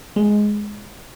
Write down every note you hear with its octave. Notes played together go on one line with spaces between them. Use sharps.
G#3